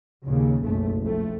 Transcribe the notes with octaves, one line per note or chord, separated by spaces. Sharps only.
D#2 A#2 C#3
F#1 B1 A3
F2 A3